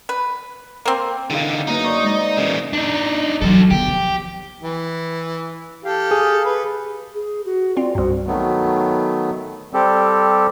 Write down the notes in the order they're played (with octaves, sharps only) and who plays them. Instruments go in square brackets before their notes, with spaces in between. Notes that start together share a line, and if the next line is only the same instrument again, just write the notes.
[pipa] B4
A#3 C4
[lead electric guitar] D3 D#3 [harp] E4 G#4 F5
[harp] F#2 A#3 B4 [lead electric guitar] D#4
[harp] C5 D5 C#6
G#3 D5
[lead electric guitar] C#3 E3 [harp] A#4
[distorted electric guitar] D4 D#4
[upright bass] E3 F#3 [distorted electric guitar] F#4 A4
[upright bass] D#3 B3 [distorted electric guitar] G4
[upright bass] F3
[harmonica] E3
G4 A4 F5
[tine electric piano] G#4
[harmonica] B4
[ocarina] G#4
F#4
[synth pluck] C4 F4 [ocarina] D5
[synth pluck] C2 G2 [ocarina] F#4
[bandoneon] D#3 F#3 A3 B3
G3 C4 G4 A4